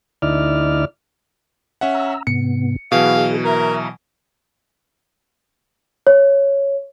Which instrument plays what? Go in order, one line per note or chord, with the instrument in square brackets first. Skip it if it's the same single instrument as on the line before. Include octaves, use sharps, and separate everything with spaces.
[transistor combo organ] D2 D#4 E4 D5 F6
[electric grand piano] C#4 E5 F#5
[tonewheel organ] A#5 E6
[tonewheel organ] G#2 C3 B3 [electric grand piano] C#7
[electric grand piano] B2 E3 F#3 [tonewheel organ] G#4 [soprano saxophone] F5
[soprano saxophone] A#4 [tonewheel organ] E5 A#5
[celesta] C#5